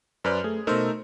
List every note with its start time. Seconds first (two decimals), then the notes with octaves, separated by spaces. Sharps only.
0.24 F#2 B4 C5 D5 F6 G6
0.44 A3 G#4
0.67 B2 A3 D#4 A#4 C5 E6